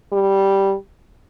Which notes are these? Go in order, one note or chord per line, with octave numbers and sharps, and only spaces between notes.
G3